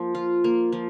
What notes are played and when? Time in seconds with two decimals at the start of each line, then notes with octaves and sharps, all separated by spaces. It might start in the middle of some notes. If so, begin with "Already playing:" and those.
Already playing: F3 A#3
0.15 F4
0.44 A#3
0.73 F3